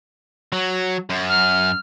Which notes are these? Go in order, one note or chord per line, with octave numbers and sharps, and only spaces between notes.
F#3
F#2
F6